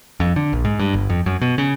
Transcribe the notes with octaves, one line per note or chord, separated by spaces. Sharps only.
F2
D3
A#1
G#2
G2
G1
F2
F#2
B2
C#3